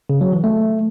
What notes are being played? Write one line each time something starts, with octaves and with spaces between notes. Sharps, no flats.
C#3
F#3
E3
A3